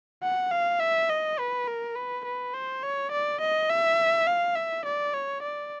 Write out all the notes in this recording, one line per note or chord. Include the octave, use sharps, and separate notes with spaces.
F#5
F5
E5
D#5
B4
A#4
B4
B4
C5
C#5
D5
D#5
E5
F5
E5
D5
C#5
D5